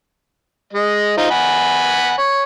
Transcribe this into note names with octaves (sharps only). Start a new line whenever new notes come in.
G#3 D#5
D#4 F4 C5
F#5 G#5 B5
C#5